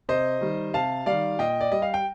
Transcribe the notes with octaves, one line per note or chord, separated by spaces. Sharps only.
C3 C5 D#5
D#3 G3
C3 F5 A5
D#3 G3 D5 F5
A#2 D#5 G5
D5
G3 D#5
F5
G5